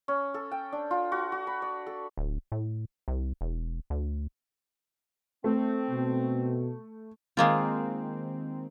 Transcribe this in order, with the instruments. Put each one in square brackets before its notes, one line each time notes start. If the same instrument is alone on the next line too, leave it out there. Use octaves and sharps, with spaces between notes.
[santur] C#4
A4
G5
D4
F4
F#4
F#4
B5
D5
A4
[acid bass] D1
A2
C2
E1
D2
[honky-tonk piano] A3 [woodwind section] C4
[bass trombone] B2
[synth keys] D#3 C4 [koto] G#3 A#3 F4